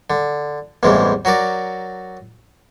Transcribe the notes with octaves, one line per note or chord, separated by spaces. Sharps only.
D3
A1 E2 G2 C3 E3 G#3
F#3 F#4 A#4 D5